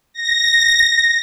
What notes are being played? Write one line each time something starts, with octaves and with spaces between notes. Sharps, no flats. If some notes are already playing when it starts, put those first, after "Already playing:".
A#6